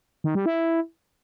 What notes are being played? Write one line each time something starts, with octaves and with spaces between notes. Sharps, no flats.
D#3
G3
E4